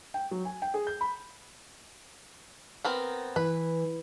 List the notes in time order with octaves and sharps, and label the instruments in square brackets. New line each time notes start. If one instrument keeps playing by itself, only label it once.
[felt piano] G5
F#3
G#5
G5
G#4
G6
B5
[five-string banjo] B3 C4 A#4
[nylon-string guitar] E3 [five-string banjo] B4